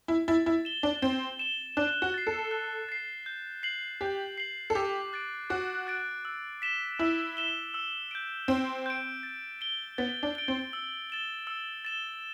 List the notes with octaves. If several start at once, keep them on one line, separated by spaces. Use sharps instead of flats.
E4
E4 A6
E4
E7 G7
D4
C4 A6
E7 G7
D4 F#6
F#4
A6 C7
A4
F#6
A6 C7
G6
C7 F#7
G4 G6
C7 F#7
A4
G4 D6
F#6 A6 D7
F#4 D6
F#6 A6 D7
E6
B6 E7 G7
E4 E6
B6 E7 G7
E6
G6 D7
C4 E6
G6 D7
A6
D7 G7
B3 A6
D4
D7 G7
C4
E6
A6 E7 G7
E6
A6 E7 G7